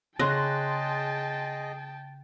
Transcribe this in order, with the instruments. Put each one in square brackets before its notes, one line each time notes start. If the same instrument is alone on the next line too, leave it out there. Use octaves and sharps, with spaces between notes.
[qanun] C#3 [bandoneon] G#4 D#5 [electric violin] G5 A5 [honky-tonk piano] C6 F#6 A#6